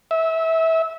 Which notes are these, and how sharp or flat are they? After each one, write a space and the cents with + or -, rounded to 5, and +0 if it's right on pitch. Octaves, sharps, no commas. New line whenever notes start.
E5 -20